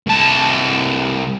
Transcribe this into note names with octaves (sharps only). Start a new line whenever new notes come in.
C2 A5